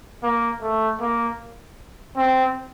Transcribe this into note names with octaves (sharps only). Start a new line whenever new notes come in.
A#3
A3
A#3
C4